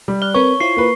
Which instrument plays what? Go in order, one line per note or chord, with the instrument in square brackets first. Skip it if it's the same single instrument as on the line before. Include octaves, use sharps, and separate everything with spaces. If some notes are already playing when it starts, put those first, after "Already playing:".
[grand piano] G3
[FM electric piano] D5 F6 F#6 [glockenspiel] G7
[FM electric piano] C4 A#4 B4 [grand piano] C#5 [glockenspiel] C#6
[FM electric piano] E4 F4 C5 [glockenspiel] C7
[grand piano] A#3 B4